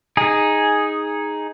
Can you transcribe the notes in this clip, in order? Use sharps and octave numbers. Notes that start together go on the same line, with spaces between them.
D#4 G#4